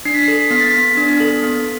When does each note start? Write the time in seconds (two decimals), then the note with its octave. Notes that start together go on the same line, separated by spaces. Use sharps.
0.05 D4 C7
0.14 B6
0.23 C7
0.28 A4
0.51 B3 B6
0.61 A6
0.70 B3 B6
0.97 D4
1.20 A4
1.43 B3